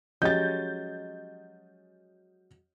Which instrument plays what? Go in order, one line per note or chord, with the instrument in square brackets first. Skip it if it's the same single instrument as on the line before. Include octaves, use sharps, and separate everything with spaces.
[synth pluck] F3 C#4 G4 [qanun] F#3 G#3 [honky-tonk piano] G6 A6